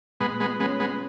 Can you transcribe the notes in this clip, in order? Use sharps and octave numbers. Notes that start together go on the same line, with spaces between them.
A#2 G#3 B3
G#3 B3
G#3 B3 C#4
G#3 B3